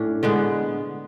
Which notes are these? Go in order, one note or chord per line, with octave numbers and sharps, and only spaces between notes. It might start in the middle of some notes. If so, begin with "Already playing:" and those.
Already playing: A2 C#4 D4
D3 G#3 B3